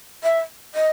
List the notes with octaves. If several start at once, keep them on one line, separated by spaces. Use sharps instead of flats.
E5
D#5